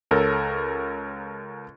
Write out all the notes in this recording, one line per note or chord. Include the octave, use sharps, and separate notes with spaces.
C#2 A4 A#4 C#5